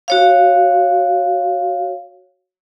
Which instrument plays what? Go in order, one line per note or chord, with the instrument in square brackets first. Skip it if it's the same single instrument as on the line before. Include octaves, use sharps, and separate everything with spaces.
[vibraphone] F#4 C#5 F5